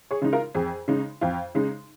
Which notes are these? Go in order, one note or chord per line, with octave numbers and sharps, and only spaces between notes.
G#4 C#5
C#3 G#3 D#4
F4 A#4
F2 G#4
C#3 G#3 D#4
F2 F4
C#3 G#3 D#4